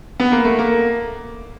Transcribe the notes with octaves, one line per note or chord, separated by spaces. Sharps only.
B3
A#3
A3
A#3